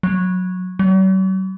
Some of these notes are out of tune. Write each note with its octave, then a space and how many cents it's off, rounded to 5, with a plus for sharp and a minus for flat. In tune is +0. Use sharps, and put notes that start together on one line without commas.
F#3 -15
F#3 +45